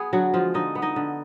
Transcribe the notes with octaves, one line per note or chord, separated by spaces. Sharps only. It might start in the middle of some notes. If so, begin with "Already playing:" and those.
Already playing: B3 G#4
D3 F#3 F#4
F3 G#3 F4
D3 D#4 D#5
B3
D#4 D#5
D3